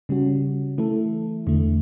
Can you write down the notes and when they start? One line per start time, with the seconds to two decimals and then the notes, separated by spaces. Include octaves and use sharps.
0.09 C#3 G3 C#4 F#4
0.78 E3 A3 E4 A4
1.47 E2 D3 A3